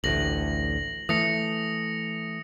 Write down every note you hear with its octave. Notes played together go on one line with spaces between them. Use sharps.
A1 D2 A2 A#6 F#7
E3 A3 D#6 A#6 C#7